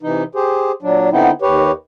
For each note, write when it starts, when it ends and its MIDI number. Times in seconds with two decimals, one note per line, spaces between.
0.03 0.23 48
0.03 0.23 52
0.03 0.23 63
0.35 0.72 67
0.35 0.72 68
0.35 0.72 72
0.82 1.09 46
0.82 1.09 54
0.82 1.09 62
1.12 1.31 50
1.12 1.31 59
1.12 1.31 60
1.12 1.31 63
1.12 1.31 64
1.42 1.72 39
1.42 1.72 67
1.42 1.72 71
1.42 1.72 73